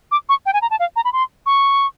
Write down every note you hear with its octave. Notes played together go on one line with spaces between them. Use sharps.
D6
C#6
G5
G#5
A#5
A5
F5
A#5
B5
C6
C#6